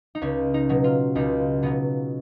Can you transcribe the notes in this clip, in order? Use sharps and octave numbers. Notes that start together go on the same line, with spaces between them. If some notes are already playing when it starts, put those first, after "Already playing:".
D#4
C#2 C#4
D#4
B2 F#3
F4
C#2 D#4
B2 F#3 B3